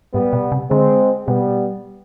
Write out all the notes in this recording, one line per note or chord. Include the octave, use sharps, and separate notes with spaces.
G#2 G3 B3
B2
C3
D3 G#3 C4
B2 G3 B3